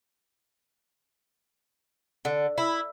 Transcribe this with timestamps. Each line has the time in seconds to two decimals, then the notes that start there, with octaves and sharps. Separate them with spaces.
2.25 D3
2.58 E4